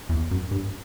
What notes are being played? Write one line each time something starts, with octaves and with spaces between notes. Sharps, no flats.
E2
F#2
G2